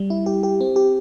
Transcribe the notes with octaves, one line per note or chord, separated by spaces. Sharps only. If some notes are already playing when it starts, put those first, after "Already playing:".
Already playing: G3
E4
G4
G4
C4
G4